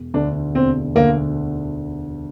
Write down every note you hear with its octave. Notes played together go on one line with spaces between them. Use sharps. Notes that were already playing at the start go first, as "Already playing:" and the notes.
Already playing: E1
D2 D3 D4
E1 C4
D2 D3 A#3